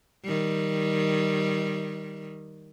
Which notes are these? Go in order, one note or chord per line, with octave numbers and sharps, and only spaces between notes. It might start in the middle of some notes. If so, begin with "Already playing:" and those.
D#3 G3